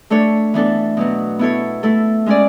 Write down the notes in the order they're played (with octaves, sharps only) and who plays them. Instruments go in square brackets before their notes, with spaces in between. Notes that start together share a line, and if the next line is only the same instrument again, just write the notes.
[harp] A3 D4 A4 C#5
E3 B3 D4 A4
B2 F#3 B3
B3 E4 A4 C#5
A3 E4 A4
G#3 C#4 G#4 D5